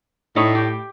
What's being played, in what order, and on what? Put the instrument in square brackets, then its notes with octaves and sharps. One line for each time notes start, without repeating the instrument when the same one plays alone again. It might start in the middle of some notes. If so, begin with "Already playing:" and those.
[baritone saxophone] A2 [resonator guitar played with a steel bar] D#4 E4 C#5
[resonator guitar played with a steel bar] G4